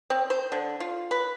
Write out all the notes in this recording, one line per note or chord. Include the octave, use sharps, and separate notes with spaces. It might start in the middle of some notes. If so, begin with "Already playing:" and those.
C4
C5
D3
F4
B4